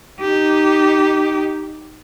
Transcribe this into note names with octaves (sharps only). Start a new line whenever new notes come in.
D#4 G4